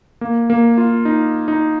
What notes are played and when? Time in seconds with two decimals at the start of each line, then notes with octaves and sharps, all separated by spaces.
0.21 A#3
0.50 A#3
0.78 F4
1.05 D#4
1.48 D#4